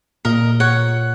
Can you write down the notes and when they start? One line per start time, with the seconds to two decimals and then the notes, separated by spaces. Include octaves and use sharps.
0.25 A#2 A#4 D#5
0.60 C#5 F#5